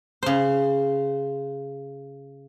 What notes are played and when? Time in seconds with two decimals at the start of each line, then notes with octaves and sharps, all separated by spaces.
0.23 C#3 C5